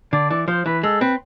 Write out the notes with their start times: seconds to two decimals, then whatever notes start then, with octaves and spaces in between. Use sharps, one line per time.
0.13 D3 D5
0.30 E3 D5
0.48 F3 C5
0.66 E3 B4
0.83 G#3 A4
1.01 C4 B4